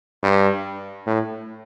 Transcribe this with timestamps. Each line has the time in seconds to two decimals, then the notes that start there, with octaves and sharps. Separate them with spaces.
0.23 G2
1.07 A2